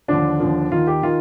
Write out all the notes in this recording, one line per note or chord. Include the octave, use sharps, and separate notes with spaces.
D#2 D3 F3 D4
D#2 D3 F3
D#2 D#3 F4
G4
D#3 F4